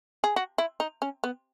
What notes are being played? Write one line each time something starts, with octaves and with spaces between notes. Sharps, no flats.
G#4
F#4
E4
D#4
C#4
B3